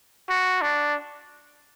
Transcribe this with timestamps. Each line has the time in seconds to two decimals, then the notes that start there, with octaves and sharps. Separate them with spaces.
0.29 F#4
0.62 D4